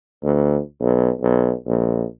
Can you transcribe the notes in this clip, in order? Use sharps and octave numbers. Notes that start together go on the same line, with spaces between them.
D2
B1
B1
A#1